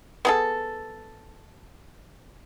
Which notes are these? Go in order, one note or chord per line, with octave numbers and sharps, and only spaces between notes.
B3 G#4 A4